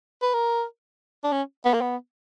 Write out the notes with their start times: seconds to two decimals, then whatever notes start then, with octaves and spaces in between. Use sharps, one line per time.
0.22 B4
0.34 A#4
1.24 D4
1.32 C#4
1.65 B3
1.74 A#3
1.81 B3